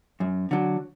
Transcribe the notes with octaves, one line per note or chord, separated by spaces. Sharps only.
F#2
D3 F#3